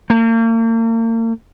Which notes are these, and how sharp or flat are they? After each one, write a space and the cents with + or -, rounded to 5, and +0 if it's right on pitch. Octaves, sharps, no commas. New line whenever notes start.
A#3 -40